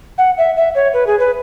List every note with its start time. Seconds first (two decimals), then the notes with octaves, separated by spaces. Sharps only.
0.18 F#5
0.38 E5
0.56 E5
0.75 C#5
0.94 B4
1.07 G#4
1.19 B4